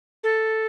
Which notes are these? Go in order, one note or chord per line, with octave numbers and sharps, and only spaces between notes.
A4